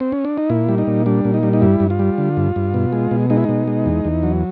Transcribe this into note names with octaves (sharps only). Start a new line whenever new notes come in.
C4
C#4
D4
D#4
A#2 E4
G3
D#4
A#2
G3 D4
A#2
D#4
G3
D#4
G2 E4
G2
F4
G3
D3
G2
G2
B2
G#3
B2
G#3 D#4
E4
B2 D#4
G#3
E2
E2
F#3